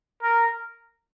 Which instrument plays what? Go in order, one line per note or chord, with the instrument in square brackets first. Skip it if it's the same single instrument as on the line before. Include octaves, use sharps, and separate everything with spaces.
[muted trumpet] A#4